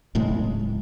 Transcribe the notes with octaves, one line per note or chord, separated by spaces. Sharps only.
D1 A2 C#3 G#3